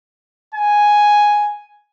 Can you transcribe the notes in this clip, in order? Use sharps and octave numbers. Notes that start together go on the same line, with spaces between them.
G#5